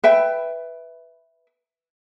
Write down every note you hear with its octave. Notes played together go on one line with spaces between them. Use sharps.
B4 E5 G5